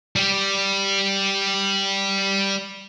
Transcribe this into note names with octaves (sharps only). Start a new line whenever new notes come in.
G3 G4